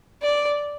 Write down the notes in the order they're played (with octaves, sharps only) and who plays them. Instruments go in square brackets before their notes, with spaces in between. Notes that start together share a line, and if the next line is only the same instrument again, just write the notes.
[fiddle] D5